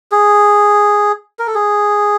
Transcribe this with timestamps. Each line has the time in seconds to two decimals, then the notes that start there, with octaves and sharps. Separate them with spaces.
0.12 G#4
1.39 A#4
1.47 A4
1.55 G#4